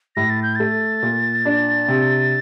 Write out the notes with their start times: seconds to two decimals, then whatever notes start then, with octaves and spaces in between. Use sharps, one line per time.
0.16 A2 A#6
0.30 A6
0.43 G6
0.56 A3 A6
1.03 A#2
1.45 D4
1.88 C3